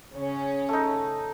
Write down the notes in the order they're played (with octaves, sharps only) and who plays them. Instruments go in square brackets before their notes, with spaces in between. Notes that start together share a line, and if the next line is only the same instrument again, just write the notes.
[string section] C#3 C#4
[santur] A3 D#4